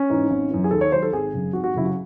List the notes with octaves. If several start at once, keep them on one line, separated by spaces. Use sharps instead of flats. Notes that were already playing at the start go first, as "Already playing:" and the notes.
Already playing: C#4
G#2 E3
G#1
F#2 E3
G#4
D#2 A4
C#5
D#3 F#3 C5
A4
G#1 G#4
F#2 C#3
G#1 F#4
F#4
F#2 C#3 F#3 E4
F#4